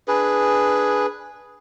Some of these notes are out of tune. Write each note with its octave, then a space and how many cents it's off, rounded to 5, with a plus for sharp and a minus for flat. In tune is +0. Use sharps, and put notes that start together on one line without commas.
D4 +0 G#4 +0 B4 +0